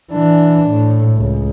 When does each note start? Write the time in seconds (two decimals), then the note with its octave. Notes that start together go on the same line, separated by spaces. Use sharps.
0.12 E3 D4
0.70 A2
1.17 C#2